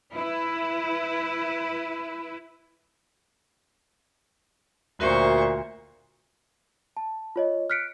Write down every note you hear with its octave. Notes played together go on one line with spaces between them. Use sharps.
E4 B4
D2 A#2 F#4 A#4 C5 E5 C#6
A5
F4 C#5 D#5
F6 F#6 B6 C#7 D7